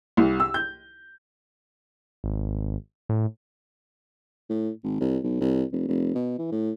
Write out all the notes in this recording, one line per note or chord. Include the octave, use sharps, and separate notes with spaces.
C2
E6
G6
G#1
A2
A2
G#1
C2
B1
C2
F1
F1
B2
E3
A2